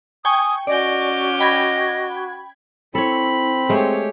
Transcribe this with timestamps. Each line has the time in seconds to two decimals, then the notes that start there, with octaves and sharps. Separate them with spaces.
0.25 G5 G#5 C#6 D#6
0.67 C#4 F#4 D5 D#5 D6 G6
1.39 D#5 G5 B5 G#6
2.95 C4 E4 A4 C#5 B5
3.69 G#3 A3 G4 C#5